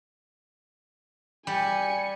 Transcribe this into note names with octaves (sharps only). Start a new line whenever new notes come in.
G3 G#5 C#7